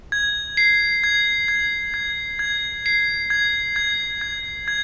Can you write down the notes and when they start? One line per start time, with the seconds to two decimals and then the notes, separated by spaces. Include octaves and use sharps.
0.12 G#6
0.57 C7
1.04 G#6
1.48 G#6
1.94 G#6
2.39 G#6
2.86 C7
3.30 G#6
3.76 G#6
4.21 G#6
4.68 G#6